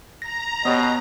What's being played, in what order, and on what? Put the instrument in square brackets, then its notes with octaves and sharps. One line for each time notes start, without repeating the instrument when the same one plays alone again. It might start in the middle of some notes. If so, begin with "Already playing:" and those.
[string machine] A#5 [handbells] A#6
[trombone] B2 [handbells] B3 [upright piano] G4 C#5 D#5